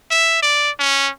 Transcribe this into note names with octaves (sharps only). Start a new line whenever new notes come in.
E5
D5
C#4